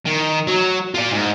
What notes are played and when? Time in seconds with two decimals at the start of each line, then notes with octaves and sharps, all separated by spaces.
0.05 D#3
0.47 F#3
0.95 F4 D5
1.13 G#2